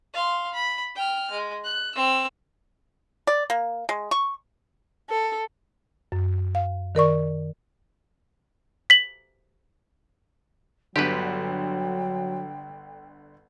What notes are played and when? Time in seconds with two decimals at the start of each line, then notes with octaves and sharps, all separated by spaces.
0.14 F5 C6
0.53 B5
0.96 G5 F6
1.31 G#3
1.64 F#6
1.95 C4 E6
3.27 D5
3.50 A#3
3.89 G#3
4.11 C#6
5.10 A4
6.12 F#2
6.55 F5
6.95 D#3 A#4 D5 C#6
8.90 B6 F#7
10.96 G1 D3 F#3 G4 B4 G5